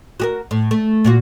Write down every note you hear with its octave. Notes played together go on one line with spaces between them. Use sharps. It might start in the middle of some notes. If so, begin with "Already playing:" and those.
F#4 G4 A#4
A2
A3
A#2 F4 F#4